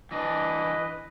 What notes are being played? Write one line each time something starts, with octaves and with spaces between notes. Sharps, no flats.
E3 D4 B4 D#5